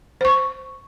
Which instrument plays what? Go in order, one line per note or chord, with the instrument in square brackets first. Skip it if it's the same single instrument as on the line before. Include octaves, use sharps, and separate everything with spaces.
[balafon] C5 C#6